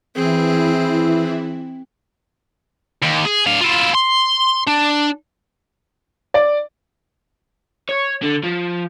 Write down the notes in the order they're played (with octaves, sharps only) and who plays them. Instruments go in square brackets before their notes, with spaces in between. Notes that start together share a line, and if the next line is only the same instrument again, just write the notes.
[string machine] E3 E4 [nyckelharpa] C4 G#4
[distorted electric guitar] D#2
G#4
D4 F5
E4 F4
C6
D4
[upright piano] D5
[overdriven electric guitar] C#5
D3
F3